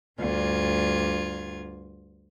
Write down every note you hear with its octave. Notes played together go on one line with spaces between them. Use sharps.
D2 G2 F4 G#6